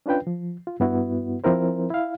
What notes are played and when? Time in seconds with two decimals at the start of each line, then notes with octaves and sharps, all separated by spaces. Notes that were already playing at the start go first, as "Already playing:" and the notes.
0.06 C#4 D4 F4 B4 G5
0.27 F3
0.67 F4
0.80 G2 B3 E4 F#4
1.44 F3 C4 E4 A#4 C5
1.90 E4 F5